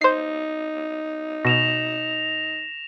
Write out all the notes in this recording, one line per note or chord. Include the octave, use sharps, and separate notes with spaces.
D#4 C5 C7
B2 A#6 E7 F7